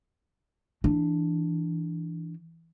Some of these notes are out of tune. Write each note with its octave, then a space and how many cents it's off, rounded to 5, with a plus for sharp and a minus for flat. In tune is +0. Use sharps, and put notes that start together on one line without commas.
E3 +0 D4 +0